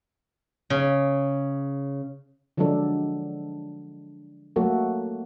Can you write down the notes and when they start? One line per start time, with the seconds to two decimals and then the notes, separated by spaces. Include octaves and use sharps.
0.70 C#3
2.57 D3 F3 F#3 G#3 D4 A4
4.56 F#3 A3 A#3 F#4 A4